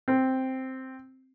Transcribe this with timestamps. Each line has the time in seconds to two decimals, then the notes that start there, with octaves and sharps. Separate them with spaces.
0.08 C4